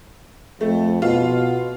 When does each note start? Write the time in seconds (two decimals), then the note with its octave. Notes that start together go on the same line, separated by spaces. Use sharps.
0.61 F2 A3
1.02 B2 F4